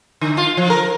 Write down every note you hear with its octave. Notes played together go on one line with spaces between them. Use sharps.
D3
F4
F3
A#4